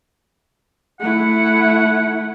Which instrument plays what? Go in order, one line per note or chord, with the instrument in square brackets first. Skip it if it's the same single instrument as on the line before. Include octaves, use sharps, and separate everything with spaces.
[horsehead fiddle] A3 E4 [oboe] F#5